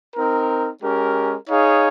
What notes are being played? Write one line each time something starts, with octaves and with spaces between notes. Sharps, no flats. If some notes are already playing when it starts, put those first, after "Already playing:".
C4 D#4 A#4
G#3 C#4 G4 A#4
D#4 G#4 C#5 F5